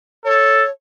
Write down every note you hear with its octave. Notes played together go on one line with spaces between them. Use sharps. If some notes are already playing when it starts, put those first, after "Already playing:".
A4 C#5